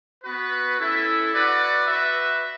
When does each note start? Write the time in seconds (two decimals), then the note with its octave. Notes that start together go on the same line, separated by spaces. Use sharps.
0.23 B3 F#4 B4
0.78 C#4 E4 A4 E5
1.32 F#4 B4 D5 F#5
1.86 F#4 B4 E5